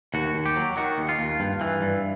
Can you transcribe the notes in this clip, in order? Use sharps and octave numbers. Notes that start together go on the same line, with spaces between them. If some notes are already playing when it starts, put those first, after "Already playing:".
D#2 F#4
D#2
G4
F#3
D#3 F#4
D#2
F4
D#2
G2
E3
G2